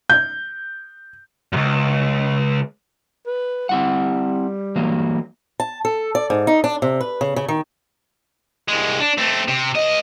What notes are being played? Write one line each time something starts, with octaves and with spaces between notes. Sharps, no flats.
G6
C#2 F#2
B4
G3 C4 E4 F#5
E3 F#3 A#3
A5
A4
D5
G#2
D#4
D4
C3
B4
C#3
C#3
D#3
C2 G#3
D4
A3 C4
C3
C#2 D#5